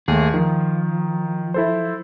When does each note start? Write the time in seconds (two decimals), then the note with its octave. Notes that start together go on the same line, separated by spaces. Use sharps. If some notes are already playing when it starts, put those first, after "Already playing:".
0.08 D#2 A3 G#4
0.34 D#3 F3
1.54 E4 A4 C5